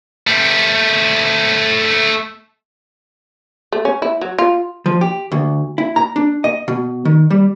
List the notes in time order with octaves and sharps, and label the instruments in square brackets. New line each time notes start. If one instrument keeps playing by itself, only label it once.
[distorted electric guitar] A3 G4
[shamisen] A3
C#4
E4
F#3
F4
[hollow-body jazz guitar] F3
G4
D2
E4
A#5
D4
D#5
B2
D#3
G3